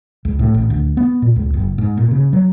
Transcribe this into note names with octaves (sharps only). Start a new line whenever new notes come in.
C#2
A2
A1
D2
B3
A#2
C#2
F#1
G#2
A#2
C#3
F#3